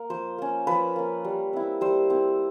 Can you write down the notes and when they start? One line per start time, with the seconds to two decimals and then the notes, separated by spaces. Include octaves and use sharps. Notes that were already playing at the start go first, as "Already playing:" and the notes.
Already playing: A#3
0.10 F3 C5
0.38 A#3 C#4
0.67 F3 B4
0.96 A#3 C#4
1.24 G3
1.53 C4 E4
1.81 G3 C5
2.10 C4 E4